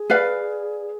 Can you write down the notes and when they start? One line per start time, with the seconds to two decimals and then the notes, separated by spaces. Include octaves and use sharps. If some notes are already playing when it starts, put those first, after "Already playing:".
Already playing: G#4
0.10 B4 D5 F5